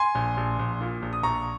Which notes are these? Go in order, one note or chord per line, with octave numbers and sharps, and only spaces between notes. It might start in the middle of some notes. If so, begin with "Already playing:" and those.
Already playing: G#5 C6
A#1
A#1
A#1
A#2
A#1
D#6
A#1 A#5 C#6